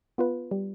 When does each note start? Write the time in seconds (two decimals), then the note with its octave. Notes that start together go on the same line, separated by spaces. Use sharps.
0.18 B3 F4 B4
0.51 G3